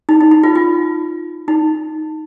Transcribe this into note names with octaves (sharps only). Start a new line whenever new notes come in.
D#4
D#4
D#4
F4
F4
D#4